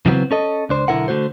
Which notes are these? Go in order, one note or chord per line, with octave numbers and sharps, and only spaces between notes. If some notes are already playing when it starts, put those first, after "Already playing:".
C#3 E3 F#3 G3 B3 C4
C#4 A4 D#5
C#2 D4 C5
B1 D3 E4 A#4 F#5
D3 A3 F#4 C5